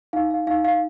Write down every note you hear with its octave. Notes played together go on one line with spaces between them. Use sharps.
D#4 F5
F5
D#4 F5
F5